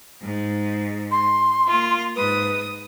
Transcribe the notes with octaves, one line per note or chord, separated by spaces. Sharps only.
G#2
C6
A#3 F4
G#2 B4 D#6